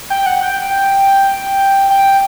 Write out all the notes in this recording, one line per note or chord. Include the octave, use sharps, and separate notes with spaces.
G5
F#5
G5
G5